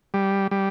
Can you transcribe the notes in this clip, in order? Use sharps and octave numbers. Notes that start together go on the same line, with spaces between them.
G3
G3